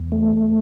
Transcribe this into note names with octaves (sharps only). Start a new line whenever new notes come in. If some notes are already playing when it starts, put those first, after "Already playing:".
Already playing: E2
A3